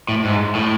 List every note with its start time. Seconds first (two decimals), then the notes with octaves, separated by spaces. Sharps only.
0.09 A2
0.25 G#2
0.55 A2